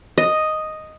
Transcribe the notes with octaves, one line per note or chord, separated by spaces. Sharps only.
D#5